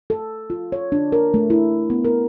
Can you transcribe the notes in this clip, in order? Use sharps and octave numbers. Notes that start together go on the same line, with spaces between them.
A4
F4
C#5
D4
A#4
A3
E4
B3
A#4